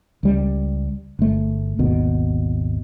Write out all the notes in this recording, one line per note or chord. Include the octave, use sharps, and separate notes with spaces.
C#2 G3
G1 A3
G#1 D#2 B2